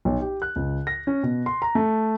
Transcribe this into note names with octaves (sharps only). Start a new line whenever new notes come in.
B1
G4
F#6
C#2
A#6
C#4
B2
C6
A#5
A3